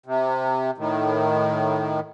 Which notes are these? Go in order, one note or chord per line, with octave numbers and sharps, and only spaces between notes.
C3
A2 D#3